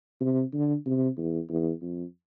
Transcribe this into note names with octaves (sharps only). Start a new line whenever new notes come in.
C3
D3
C3
E2
E2
F2